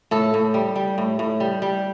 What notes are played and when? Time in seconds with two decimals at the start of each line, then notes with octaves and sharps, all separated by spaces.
0.11 A2 A4
0.34 A2
0.54 G3
0.76 G3
0.98 A2
1.19 A2
1.40 G3
1.62 G3